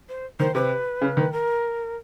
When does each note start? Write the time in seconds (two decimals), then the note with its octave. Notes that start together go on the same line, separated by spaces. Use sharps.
0.09 C5
0.39 D#3 C5
0.55 C3 B4
1.01 C#3
1.17 D#3
1.32 A#4